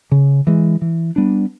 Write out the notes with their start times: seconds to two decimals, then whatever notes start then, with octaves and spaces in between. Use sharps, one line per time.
0.12 C#3
0.47 E3 G#3
0.82 E3
1.16 G3 B3 D4